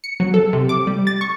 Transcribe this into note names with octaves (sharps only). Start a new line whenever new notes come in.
C#7
F#3
A4
C3
D6
G3
A6
C#6